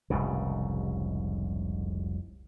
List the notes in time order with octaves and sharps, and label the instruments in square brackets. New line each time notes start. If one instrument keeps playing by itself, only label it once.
[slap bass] F1 C2 G#2 C#3